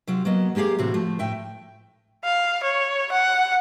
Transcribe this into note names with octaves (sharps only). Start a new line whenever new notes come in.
C3 F#3 F4
F#3 A#3 B3 D#5
G#3 A#3 G4 G#4 F5
A2 C3 E3 C4 F#4
F3 A3
A2 E5 G5
F5
C#5
F#5